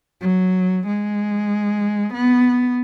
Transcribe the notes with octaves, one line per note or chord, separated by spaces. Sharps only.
F#3
G#3
B3